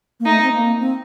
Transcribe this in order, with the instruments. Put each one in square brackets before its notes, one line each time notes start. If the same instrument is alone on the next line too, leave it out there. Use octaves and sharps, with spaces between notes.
[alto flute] A#3
[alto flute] A3 [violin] D#4
[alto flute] C4
A#3
C4